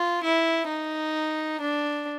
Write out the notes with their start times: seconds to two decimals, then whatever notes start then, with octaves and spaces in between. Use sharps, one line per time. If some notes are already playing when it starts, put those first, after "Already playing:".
Already playing: F4
0.24 E4
0.69 D#4
1.61 D4